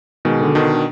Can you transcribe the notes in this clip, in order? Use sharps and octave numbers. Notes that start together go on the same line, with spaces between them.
B2 D#3 G#3
D3
B2 D#3 D4